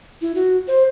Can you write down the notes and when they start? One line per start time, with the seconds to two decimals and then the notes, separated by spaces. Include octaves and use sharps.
0.22 E4
0.35 F#4
0.68 C5